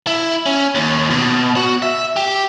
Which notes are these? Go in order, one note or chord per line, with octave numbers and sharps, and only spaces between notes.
E4
C#4
D#2
B2
F#4
E5
G4